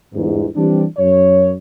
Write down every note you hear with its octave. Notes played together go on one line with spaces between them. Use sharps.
G1 E2 G#2
E3 G3 C4 D4
F#2 C#5